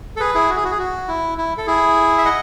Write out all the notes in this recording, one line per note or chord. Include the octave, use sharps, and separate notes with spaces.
A4
G#4 B4
E4 G#4
F#4
G#4
F#4
G#4
F#4
E4
E4
A4
E4 G#4
E5
D#5 F#5